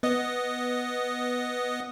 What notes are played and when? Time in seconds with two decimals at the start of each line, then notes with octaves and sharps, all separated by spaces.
0.03 B3 D#5